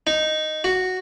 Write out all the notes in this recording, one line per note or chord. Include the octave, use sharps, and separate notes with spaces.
D#4
F#4